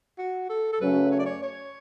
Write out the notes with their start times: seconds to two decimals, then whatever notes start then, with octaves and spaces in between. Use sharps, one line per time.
0.18 F#4
0.49 A4
0.73 A4
0.80 F#2 C#3 F#3 A3 C#4 B4
1.12 C#5
1.19 D5
1.26 C#5
1.43 C#5